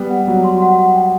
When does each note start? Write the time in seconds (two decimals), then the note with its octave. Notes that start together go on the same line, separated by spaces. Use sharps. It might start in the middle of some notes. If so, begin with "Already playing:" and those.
Already playing: G3 B3
0.10 F#5
0.28 F#3 F#5
0.44 C6
0.62 F#5
0.79 F#5
0.96 G5